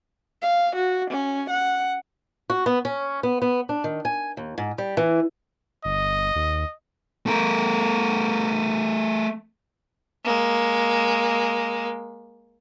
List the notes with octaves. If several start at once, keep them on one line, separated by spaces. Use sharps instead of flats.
F5
F#4
C#4
F#5
F#4
B3
C#4
B3
B3
D4
D#3
G#5
D#2
G#2
G3
E3
G1 D#5
D#2
A3 A#4
G#3 A#3